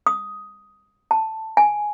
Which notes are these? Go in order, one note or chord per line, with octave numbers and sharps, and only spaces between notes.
D#6
A5
G#5